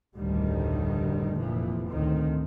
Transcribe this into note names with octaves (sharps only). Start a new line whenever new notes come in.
F1 D2 A2 D3 D#3 G3
F1 A#2 E3 F3
D2 A2 D#3 C4